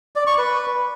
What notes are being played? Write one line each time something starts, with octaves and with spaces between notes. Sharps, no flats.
D5
C#6
B4